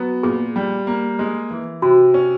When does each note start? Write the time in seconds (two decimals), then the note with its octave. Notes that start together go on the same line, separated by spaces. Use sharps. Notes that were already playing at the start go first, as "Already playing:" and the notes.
Already playing: F#3 B3
0.23 A#2 G#4
0.56 G3
0.87 A#3
1.19 G#3
1.51 E3
1.82 C3 F#4
2.14 C#4